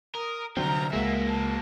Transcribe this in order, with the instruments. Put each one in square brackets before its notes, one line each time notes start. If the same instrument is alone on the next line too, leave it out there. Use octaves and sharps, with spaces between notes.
[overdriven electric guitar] A#4 [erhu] D#6
[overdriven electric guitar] C2 F3 [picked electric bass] D3 F#3 C4 [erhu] A#5
[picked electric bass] C#2 G#3 [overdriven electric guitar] A#3 F#4 [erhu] E5
[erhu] A5